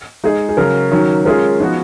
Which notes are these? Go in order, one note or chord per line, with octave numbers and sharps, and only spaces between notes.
G#3 D#4 G#4
G#4
C#3 F#3 C#4 A#4
D#3 F#3 C#4
G#3 C#4 F4 G#4 A#4
F3 B3 D#4 F#4